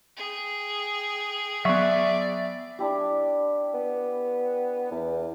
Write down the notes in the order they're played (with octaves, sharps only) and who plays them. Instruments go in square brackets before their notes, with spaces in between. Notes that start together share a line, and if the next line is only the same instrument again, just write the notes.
[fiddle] G#4 G5
[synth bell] F#3 B3 [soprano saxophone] D5 [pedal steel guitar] E5 C#6
[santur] D4 E4 G4
[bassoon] B3
E2